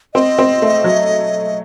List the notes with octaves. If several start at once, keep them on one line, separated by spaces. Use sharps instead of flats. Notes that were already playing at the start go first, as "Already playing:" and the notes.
C4 D#5
C4
A3
F#3